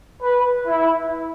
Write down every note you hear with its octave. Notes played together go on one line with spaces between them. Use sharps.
B4
E4